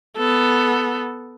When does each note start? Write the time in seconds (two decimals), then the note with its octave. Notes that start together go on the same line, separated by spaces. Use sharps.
0.17 B3 A4